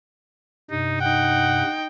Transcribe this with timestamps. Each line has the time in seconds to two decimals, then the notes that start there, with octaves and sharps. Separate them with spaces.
0.71 G2 C3 D#4
1.01 D#4 F#5 G5